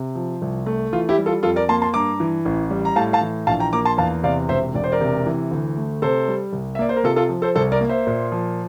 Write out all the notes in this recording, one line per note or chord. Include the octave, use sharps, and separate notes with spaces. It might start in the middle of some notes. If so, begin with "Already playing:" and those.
Already playing: C3
F3
C2
A3
E3 F4
E4 G4
G3
F4 A4
F2 F4 A4
A#4 D5
A#3 A5 C6
A5 C6
G2 A#5 D6
E3
A1
G3
A#5
A2 F5 A5
F5 A5
E3
A#1 F5 A5
G5 A#5
A#3 A#5 D6
A5 C6
E2 F5 A5
C3 D5 F5
E1 C5 E5
E1 D5
C5
A#4 D5
C3
E3
D2
A3
C3 A4 C5
G3
C2
E5
A#3 D5
C5
A#4
C3 F4 A4
F4 A4
F3
A4 C5
C2 A4 C5
A#4 D5
A#3
C5 E5
A#2
F3